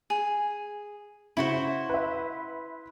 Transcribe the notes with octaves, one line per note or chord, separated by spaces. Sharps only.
G#4
C#3 E4 F#4 C5
B4 E5